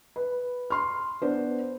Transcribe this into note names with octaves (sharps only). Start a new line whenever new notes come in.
B4
C6 F6
B3 D4 C5